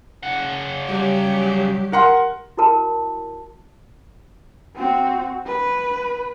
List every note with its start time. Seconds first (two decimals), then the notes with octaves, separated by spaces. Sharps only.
0.23 C#3 F#5
0.89 F#3 G3 G4
1.92 A#4 F#5 C6
2.57 E4 F#4 A#4 A5
4.75 C4 F#4
5.46 B4